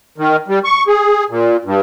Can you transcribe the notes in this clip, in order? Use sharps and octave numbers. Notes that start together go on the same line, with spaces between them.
D#3
G3
C#6
G#4
A#2
G2